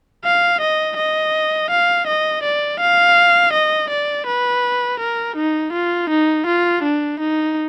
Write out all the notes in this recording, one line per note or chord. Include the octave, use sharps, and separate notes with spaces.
F5
D#5
D#5
F5
D#5
D5
F5
D#5
D5
B4
A#4
D#4
F4
D#4
F4
D4
D#4